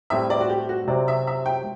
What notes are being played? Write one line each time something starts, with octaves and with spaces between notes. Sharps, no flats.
A2 G3 C4 E4 B4 E5
D5
F#4
G4
F#4
C3 F#3 C4 D5
E5
E5
G5